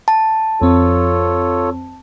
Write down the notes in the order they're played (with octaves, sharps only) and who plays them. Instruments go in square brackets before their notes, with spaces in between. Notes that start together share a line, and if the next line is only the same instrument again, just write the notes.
[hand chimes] A5
[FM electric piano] F2 C4 [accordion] F4 A4 C#5